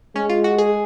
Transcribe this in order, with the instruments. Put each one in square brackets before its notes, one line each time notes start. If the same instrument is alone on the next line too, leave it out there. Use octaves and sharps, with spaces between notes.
[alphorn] G#3 [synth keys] C#4
[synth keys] F4
F#4
G#4